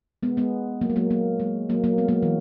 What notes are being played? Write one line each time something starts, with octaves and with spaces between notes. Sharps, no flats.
G#3 B3
G#3 B3
F#3 A#3
G#3
F#3 A#3
F#3 A#3
G#3
F#3 A#3
F#3 A#3
G#3 B3
F#3 A#3
E3